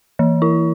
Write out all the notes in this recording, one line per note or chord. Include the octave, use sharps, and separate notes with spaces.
E3
E4